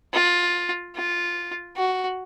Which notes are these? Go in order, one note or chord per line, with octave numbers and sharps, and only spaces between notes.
F4
F4
F#4